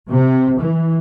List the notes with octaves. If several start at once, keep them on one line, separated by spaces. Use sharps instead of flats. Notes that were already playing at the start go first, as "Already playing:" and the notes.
C3
E3